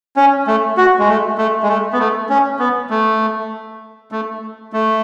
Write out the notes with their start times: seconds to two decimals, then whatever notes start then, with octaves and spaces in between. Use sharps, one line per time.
0.16 C#4
0.47 A3
0.77 F#4
0.99 G#3
1.08 A3
1.38 A3
1.63 G#3
1.69 A3
1.93 B3
1.99 A3
2.29 C#4
2.59 B3
2.90 A3
4.12 A3
4.73 A3